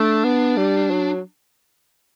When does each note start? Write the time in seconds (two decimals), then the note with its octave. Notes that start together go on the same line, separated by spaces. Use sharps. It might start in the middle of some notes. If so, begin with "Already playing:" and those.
Already playing: A3 D4
0.24 B3
0.57 G3
0.91 F#3